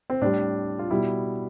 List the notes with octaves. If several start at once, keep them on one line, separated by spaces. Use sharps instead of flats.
C4
A2 G3 D4
F4
B2 G3 E4